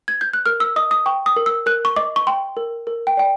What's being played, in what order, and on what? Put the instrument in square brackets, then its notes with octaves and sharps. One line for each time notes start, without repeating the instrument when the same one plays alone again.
[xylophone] G#6
G6
F#6
A#4 F6
E6
D#5 D#6
D#6
G5 C#6
D#6
A#4
E6
A#4 F#6
C#6
D#5 D6
C#6
G5 C6
A#4
A#4
G5
D5 G5